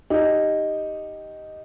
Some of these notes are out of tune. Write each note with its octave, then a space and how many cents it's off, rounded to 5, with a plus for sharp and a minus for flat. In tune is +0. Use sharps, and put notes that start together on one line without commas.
D#4 +0 G4 +0